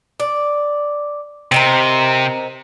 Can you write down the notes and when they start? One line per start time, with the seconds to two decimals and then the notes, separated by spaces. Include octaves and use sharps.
0.20 D5
1.52 C3 C4 D#4 A#4